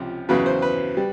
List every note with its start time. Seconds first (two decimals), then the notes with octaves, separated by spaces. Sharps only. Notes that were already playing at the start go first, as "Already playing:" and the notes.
Already playing: C#2 C3 F3
0.29 E2 C#3 F#3 B4
0.46 C5
0.62 B4
0.97 G3